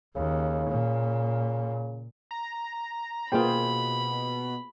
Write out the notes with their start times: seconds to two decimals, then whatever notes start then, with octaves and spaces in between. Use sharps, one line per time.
0.16 D#2 C#3
0.70 A#2
2.31 A#5
3.32 B2 A#3 F4 G#4 C5 G5 B5